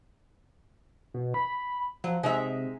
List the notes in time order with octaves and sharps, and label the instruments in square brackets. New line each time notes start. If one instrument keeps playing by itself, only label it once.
[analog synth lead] B2
B5
[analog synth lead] F3 [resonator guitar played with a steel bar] F#3
[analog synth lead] C3 [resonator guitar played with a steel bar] G#3 D#4 E5